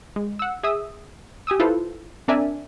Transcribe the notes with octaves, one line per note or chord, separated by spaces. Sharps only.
G#3
F#5 E6
G#4 E5 D#6 E6
G4 G#5 D#6 E6
E4 F4 A4 B4 C5
C4 D4 A#4 D5 E5 G#5